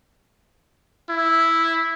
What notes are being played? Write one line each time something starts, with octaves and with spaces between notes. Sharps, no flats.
E4